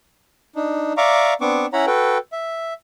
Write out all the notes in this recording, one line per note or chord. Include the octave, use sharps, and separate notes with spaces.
D4 D#4
D5 E5 F5 A#5 C#6 D6
B3 C4 D4 C#6 D6
C#4 E4 C#5 F#5 A#5 B5
F#4 A4 B4 G5
E5